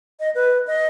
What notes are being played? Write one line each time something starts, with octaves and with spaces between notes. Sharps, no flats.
D#5
B4
D#5